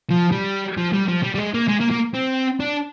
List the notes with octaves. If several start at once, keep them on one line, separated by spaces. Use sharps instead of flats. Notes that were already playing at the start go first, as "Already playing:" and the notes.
F3
G3
F3
G3
F3
G3
G3
G#3
A#3
G#3
A#3
A#3
C4
D4